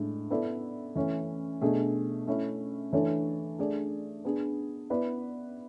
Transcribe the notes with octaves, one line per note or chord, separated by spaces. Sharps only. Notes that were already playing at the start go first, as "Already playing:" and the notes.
Already playing: A2 G#3 D4
B3 E4 A4 D5
E3 A3 C#4
B2 A3 D4 G#4
A3 C#4 E4
E3 A3 D4 A4 C#5
A3 D4 G#4 D5
B3 D4 G#4
B3 E4 B4 D5